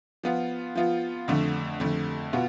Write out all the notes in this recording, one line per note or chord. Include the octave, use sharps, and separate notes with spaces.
F3 B3 F4
F3 B3 F4
F2 D3 A3
F2 D3 A3
B2 B3 F4